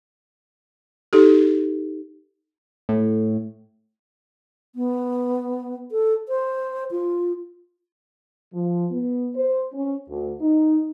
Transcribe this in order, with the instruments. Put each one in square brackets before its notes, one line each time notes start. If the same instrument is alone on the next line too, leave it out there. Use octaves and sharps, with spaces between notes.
[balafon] D#4 G4 A4
[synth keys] A2
[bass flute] B3
A4
C5
F4
[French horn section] F3
B3
C5
C#4
D2
D#4